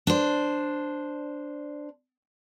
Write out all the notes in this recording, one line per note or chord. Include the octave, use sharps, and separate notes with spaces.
D4 C5